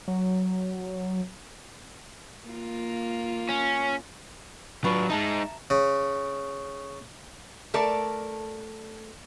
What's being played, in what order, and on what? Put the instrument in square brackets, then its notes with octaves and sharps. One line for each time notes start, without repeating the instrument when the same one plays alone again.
[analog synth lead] F#3
[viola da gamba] A#3 F4
[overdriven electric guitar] C#4
[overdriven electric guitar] F#3 D4 [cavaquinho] F4 B4 C#6
[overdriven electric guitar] G#3 D#4 [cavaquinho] E5 A5 A#5
[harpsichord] C#3
[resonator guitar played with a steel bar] A3 A4 A#4 D5